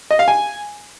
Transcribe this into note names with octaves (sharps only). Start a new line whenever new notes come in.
D#5
F5
G#5